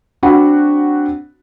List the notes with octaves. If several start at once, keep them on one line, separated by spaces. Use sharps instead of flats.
C4 D4 F#4 F#5 B5